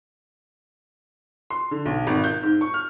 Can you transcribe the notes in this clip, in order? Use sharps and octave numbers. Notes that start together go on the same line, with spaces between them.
C6
D3
B1
G#1
G6
G#2
C#6
F6